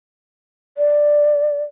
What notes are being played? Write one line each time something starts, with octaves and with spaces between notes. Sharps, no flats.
D5